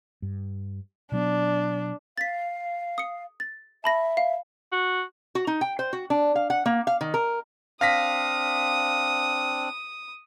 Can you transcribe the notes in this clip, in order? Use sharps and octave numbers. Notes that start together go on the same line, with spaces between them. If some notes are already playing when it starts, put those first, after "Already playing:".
G2
B2 F#3 B3 D4
F5 A6 B6
D#6 C#7
A6
E5 A5 B5 A#6
F5
F#4
F#4
D#4
G5
C5
F#4
D4
F5
F#5
A#3
F5
D#3
A#4
C4 D4 F5 D#6 A#6 B6